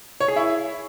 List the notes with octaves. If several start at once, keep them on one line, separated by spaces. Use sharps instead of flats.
C#5
G#4
E4